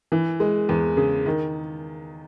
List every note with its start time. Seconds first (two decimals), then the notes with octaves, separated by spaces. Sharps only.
0.12 E3
0.40 G#3
0.69 E2
0.97 C#3
1.26 D#3